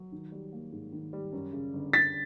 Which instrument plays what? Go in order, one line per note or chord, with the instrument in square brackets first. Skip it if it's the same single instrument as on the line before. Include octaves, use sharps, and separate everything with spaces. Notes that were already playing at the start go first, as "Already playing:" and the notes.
Already playing: [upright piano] F#3
D#3
G3
A#3
G#2
D#3
G3
F#2
C#3
G1
[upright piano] G1 [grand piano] A6 B6